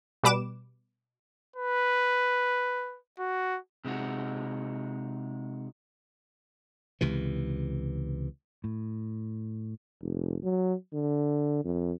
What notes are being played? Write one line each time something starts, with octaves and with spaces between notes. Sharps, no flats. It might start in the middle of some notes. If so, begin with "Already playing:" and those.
B2 G3 B4 D6 E7
B4
F#4
C3 G#3 D#4 F#4
C#2 C3 E3
A2
F1
F#3
D3
F2